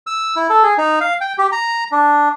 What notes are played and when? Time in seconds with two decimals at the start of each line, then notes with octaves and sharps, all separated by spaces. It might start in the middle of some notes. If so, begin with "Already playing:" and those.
0.07 E6
0.36 E4
0.50 A4
0.63 G#4
0.78 D#4
1.01 F5
1.21 G5
1.38 G4
1.52 A#5
1.92 D4